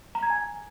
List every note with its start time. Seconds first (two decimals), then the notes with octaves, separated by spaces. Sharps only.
0.15 A#5
0.23 G#6
0.30 G#5